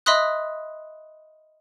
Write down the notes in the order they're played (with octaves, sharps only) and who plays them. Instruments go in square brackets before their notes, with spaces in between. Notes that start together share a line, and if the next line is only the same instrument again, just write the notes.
[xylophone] D#5 E5 B5 C6 D#6 F#6